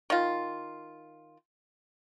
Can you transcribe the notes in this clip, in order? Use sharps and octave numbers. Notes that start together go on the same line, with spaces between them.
D#3 F4